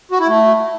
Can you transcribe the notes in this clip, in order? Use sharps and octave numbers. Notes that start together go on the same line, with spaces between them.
F#4
E4
A3